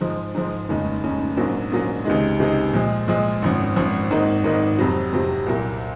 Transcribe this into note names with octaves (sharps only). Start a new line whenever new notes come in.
G#2 F3 G#3
G#2 F3 G#3
F1 D#2 C#3 G#3 C#4
F1 D#2 C#3 G#3 C#4
A#1 G#2 F#3 A#3 C#4
A#1 G#2 F#3 A#3 C#4
C#2 C3 D#3 G#3
C#2 C3 D#3 G#3
A#2 F3 G#3
A#2 F3 G#3
G#1 F#2 F3
G#1 F#2 F3
G#1 G#2 D#3 A#3 D#4
G#1 G#2 D#3 A#3 D#4
F2 C3 F#3
F2 C3 F#3
C2 A#2 F#3 A#3